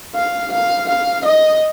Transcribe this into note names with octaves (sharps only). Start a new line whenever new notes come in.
F5
F5
F5
D#5